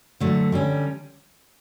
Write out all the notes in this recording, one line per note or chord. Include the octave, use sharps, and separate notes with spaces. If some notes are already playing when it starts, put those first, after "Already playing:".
D3 F#3 A3
D3 G3 C#4